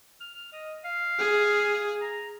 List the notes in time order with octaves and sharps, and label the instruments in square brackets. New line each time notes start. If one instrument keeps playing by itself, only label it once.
[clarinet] F6
D#5
F5
[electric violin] G#4
[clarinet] A#5